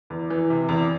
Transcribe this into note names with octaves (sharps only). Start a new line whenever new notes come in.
E2
E3
C3
E2